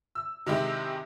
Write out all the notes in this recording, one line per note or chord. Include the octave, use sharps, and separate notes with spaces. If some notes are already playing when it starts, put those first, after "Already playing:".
E6
C3 D#3 G#3 E4 G4